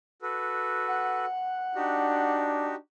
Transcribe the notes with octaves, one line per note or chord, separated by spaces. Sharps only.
F#4 A4 B4
F#5
D4 D#4 F#4 G4